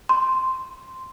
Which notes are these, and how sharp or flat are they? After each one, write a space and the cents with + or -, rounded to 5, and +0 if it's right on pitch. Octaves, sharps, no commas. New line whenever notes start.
C6 +0